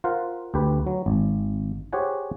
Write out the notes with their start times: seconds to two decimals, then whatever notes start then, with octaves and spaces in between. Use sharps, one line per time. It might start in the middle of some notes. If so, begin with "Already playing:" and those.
0.04 F4 A#4 C5 F5 F#5
0.54 D2 G4 B4
0.87 F#3
1.06 G#1
1.93 G4 G#4 C5 C#5 F#5 G#5